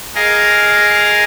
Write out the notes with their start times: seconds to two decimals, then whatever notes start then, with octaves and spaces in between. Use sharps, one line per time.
0.15 G#4 A#4 D#5 F5